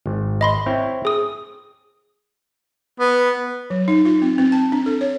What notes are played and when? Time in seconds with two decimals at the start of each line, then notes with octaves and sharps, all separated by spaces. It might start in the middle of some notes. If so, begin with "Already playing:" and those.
0.06 G#1
0.41 D#5 B5 C6
0.66 C4 E4 C#5
1.05 G#4 D#6
3.00 B3
3.70 F#3
3.88 D#4
4.05 F4
4.22 C4
4.38 C4
4.52 A5
4.72 D4
4.86 A4
5.01 C#5